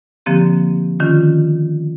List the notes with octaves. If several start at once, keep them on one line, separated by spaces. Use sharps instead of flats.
D3 F3 A#3 C4 G4
D3 D#3 C#4 F4